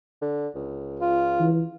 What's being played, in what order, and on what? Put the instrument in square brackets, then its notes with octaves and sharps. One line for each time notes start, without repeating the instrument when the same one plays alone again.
[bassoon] D3
C#2
[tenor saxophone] F4
[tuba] E3